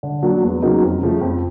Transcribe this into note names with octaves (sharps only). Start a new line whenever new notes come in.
D3
F#3 A#3 D4
E2
C#3 F#3 A#3 D#4
F2
C#3 F3 A3
F2